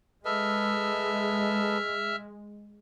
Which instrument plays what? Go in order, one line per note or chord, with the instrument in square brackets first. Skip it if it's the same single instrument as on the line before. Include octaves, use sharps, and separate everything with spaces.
[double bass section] G#3 [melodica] A4 B4 D#5 [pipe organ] E5 E6 F6